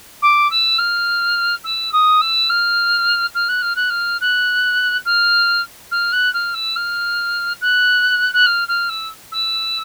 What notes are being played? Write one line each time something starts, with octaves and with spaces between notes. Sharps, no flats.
D6
E6
F6
E6
D#6
E6
F6
F6
F#6
F6
F#6
F6
F#6
F6
F6
F#6
F6
E6
F6
F#6
F#6
F6
F6
E6
E6